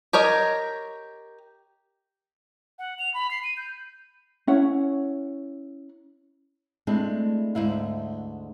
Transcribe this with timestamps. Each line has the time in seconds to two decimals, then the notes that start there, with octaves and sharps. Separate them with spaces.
0.13 G4 A#4 C#5 D#5
2.79 F#5
2.99 F7
3.14 B5
3.31 C7
3.44 D#7
3.57 G6
4.47 C#4 E4 C#5 F#5
6.87 G#3 A3 C4 D4 E4
7.55 D2 G#2 E4 F5